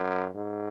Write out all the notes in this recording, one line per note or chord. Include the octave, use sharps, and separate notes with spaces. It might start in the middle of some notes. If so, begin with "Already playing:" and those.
Already playing: F#2
G#2